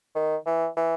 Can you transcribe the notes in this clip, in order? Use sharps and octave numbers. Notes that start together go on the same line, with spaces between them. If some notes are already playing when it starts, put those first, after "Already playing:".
D#3
E3
E3